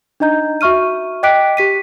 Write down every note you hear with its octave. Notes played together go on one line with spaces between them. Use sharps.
D4 D#4 D#5 A#5 G6
F#4 E5 C#6 F6 D#7
D#5 G5 D6 F#6 B6 D7
G4 B6 D#7